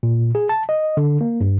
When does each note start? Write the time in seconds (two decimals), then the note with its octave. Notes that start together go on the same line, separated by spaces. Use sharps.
0.03 A#2
0.35 G#4
0.49 A5
0.69 D#5
0.97 D3
1.21 A#3
1.41 G2